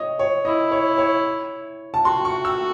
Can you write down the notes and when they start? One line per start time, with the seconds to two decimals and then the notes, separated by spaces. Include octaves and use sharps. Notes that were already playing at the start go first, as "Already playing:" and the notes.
Already playing: C#5 D#5
0.19 C#5
0.45 E4 D#5
0.72 C#5
0.98 C#5
1.94 A5
2.05 F#4 C6
2.25 C#6
2.45 E6